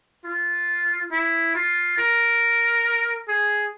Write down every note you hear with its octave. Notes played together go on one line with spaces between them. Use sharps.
F4
E4
F4
A#4
G#4